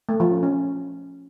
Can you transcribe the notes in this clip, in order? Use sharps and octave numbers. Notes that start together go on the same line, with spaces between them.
A3
F3
C#4
C#4